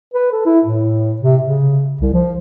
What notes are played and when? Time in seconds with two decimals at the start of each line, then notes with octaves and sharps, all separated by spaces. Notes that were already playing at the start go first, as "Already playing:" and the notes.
0.14 B4
0.32 A4
0.46 E4
0.65 A2
1.21 C3
1.43 C#3
2.01 C2
2.14 F3